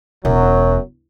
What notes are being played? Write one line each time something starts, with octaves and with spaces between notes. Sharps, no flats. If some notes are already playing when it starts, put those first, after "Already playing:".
E1 F#2 F#3